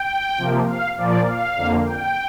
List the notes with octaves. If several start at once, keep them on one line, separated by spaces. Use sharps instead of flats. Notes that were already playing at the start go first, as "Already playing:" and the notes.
Already playing: G5
C3 F3 A#3
F5
A#2 F3 A#3 D5
F5
F2 D3 A#3
G5